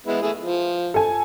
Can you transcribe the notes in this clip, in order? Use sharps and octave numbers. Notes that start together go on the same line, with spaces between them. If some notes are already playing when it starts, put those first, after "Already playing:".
G#3 B3 E4
A3 E4 G#4
F3
A4 G#5